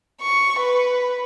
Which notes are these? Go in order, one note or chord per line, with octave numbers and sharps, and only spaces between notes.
C#6
B4